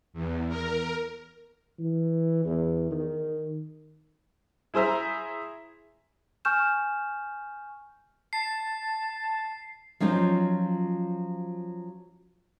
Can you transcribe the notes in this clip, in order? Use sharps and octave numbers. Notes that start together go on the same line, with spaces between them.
E2
A#4
E3
E2
D#3
E4 G#4 C5 E5 A#5
G#5 C#6 F6 G6 E7
A5 C7
F3 F#3 C#4 D#4 F4 C5